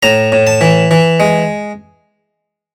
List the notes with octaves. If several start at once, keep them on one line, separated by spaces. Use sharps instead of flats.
A2 A#5
A2
A5
E3
E3
G#3